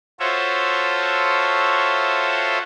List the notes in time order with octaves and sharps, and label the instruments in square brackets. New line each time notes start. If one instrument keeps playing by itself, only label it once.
[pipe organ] F4 F#4 A4 C5 C#5 E5